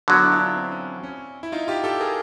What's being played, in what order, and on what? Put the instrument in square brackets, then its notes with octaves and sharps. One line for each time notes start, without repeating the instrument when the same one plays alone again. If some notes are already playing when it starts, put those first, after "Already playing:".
[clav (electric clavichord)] D3 F#3 B3
[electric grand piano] D4 E4
F4
D4 E4
C4
C#4
C#4
E4
D#4 F4
F4 G4
G4 A4
G#4 A#4